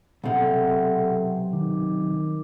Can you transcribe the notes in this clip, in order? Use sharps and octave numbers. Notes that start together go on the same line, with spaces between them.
B1 C3 A4 E5 F#5
D#3 D6